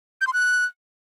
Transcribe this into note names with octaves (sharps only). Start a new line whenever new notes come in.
G6
C6
F#6